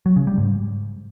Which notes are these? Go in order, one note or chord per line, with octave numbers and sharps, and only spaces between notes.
F#3
C#3
G3
G#2